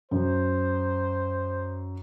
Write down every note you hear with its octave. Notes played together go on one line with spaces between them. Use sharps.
F#2 C5